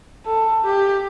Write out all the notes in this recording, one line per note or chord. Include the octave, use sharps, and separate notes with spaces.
A4
G4